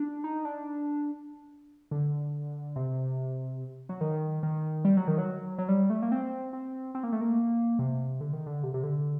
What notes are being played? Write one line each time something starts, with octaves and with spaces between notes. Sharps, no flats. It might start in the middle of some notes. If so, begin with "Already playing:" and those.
Already playing: D4
D#4
D4
D3
C3
F#3
D#3
D#3
G3
F#3
D#3
F#3
F#3
G3
A3
A#3
C4
C4
C4
A#3
A3
A#3
C3
D3
D#3
D3
C3
C3
D3